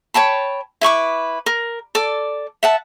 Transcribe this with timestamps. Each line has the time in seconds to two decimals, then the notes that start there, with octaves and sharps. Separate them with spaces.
0.14 C#5 G5 A5 B5
0.81 E4 B4 C#6 D6
1.46 A#4
1.95 A4 D5 D6
2.63 E5 F#5 A5